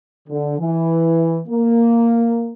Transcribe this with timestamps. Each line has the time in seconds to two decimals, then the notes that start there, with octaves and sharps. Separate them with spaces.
0.29 D3
0.59 E3
1.47 A#3